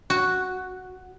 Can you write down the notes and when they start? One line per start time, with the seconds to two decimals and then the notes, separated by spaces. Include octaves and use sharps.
0.10 F#4